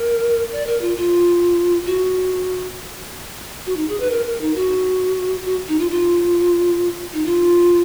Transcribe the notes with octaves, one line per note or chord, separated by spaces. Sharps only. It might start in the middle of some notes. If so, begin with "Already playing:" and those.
Already playing: A#4
D5
A#4
F4
F4
F#4
F#4
D#4
G#4
B4
A#4
A#4
D#4
F#4
F#4
D#4
F4
F4
D#4
F4